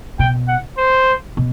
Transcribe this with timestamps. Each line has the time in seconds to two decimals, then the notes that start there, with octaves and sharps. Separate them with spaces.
0.19 B2 G5
0.48 F#5
0.77 C5
1.37 B2